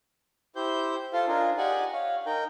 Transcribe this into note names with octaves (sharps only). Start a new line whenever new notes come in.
E4 G4 C5 G6
F4 A4 C5 F5 A5
D4 D#4 F4 G#4 A#4
G4 D5 D#5 F#5 G#5
C#5 F5
D#4 A#4 G5